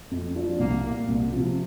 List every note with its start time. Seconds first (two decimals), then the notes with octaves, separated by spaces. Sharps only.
0.11 F2
0.35 F3 D4 F4
0.59 C2 A#3
0.85 A#2 A#3
1.08 C2
1.32 C3 F3